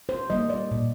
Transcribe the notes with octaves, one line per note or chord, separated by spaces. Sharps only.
C5
G3 A#3 D#5
D5
A#2